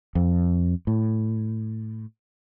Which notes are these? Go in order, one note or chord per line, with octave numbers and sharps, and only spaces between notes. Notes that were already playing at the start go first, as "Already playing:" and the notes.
F2
A2